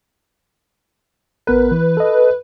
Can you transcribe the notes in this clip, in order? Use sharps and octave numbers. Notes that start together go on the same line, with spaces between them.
A1 B3 A#4 B4
E3
A4 D#5